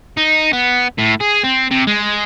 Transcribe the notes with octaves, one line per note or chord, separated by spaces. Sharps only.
D#4
B3
A2
G#4
C4
C3
G#3